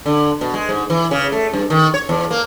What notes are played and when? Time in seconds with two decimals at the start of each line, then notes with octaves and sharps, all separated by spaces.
0.06 D3
0.41 B2
0.54 G#3
0.69 G#2
0.90 E3
1.11 C#3
1.32 A3
1.53 G2
1.70 D#3
1.94 C#5
2.09 E2
2.31 A#3